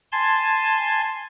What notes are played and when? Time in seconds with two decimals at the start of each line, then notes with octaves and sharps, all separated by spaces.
0.12 G#5 A5 C6